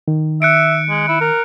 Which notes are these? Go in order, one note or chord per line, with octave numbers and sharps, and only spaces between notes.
D#3
E5 F#6 C#7 D7
G#3
E4
A#4